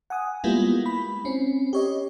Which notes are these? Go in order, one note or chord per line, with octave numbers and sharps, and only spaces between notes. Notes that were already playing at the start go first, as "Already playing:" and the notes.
F#5 G#5 D#6
G3 G#3 A#3 B3 E4 F4
B5
C4 C#4
G4 C#5 D#5